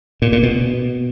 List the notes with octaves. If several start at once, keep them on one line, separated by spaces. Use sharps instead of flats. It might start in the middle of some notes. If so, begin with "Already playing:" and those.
A#2
A#2
B2